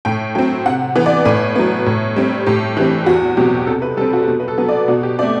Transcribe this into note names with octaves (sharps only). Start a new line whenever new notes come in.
A2 G5
F#3 C4 G5
C3 F#5
E3 B3
D5
A2 B4
F#3 B3
A2
G3 C4
A2 G4
E3 G3 C4
E2 F#4
B2 F#3 C4 G4
C3 A4
B4
G3 C4 A4
F#4
B2
B4
A4
F#3 B3
D5
B2 F#4
G4
A3 C4 D5